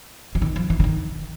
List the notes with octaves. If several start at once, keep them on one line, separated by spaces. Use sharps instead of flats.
E3
D#3
F3
E3
D3
D#3